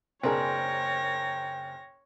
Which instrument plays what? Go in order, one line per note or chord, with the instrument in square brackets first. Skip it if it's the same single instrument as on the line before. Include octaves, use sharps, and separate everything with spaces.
[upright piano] F#1 A#4 [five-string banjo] C4 D4 G#4 [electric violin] C#5 A#6 [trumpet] G5